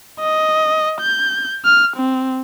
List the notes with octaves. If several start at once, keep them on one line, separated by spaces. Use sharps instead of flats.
D#5
G6
F6
C4